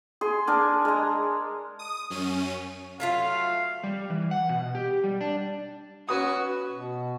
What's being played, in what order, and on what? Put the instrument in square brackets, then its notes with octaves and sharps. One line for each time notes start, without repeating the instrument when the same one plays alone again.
[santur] G#4 C6
D4 A#4 G#5
G#3 A#5
[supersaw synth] D#6
F#2 C#4 D#7
[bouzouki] F#3 A3 F4 [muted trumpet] F5
[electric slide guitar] G3
E3
F#5
B2
G4
G3
D4
[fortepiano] C#4 B4 D#6 [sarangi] F#4
[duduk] B2